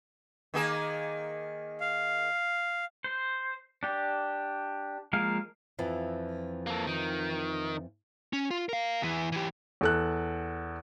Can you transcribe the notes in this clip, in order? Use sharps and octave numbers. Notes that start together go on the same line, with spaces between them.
D#3 A#3 G#4
F5
C5
D4 G4
F3 G#3 A#3 A#4 F5
F2 E3 F3
A#3 A4
D#3
C#4
F4
A#4 F5
E2 E3
E3 G4
E2 A4 F#6